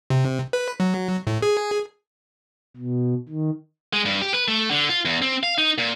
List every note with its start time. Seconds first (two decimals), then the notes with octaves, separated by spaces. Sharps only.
0.10 C3
0.53 B4
0.80 F#3
1.27 A2
1.42 G#4
2.77 B2
3.29 D#3
3.93 G#3
4.05 G2
4.21 G4
4.34 B4
4.48 A3
4.71 D3
4.89 F4
5.05 E2
5.22 C4
5.43 F5
5.58 D#4
5.78 A#2